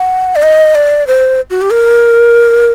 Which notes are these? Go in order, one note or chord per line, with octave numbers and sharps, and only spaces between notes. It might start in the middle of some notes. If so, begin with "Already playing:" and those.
Already playing: F#5
D5
D#5
D5
C5
F#4
G4
A#4